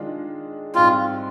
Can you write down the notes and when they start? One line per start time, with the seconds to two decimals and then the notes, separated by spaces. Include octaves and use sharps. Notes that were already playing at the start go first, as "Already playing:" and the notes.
Already playing: D#3 G#3 D4 F4
0.74 G#2 G3 C4 F4